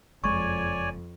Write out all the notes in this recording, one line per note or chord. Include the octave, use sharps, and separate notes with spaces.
F#1 F2 G#3 C#5 D5 G#5 C#6